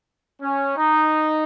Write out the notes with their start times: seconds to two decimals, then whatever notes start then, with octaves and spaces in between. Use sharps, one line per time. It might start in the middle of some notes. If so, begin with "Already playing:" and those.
0.42 C#4
0.77 D#4